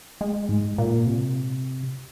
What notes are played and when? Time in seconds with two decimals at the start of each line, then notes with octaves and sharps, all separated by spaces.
0.21 G#3
0.49 G#2
0.78 A#2
1.07 C3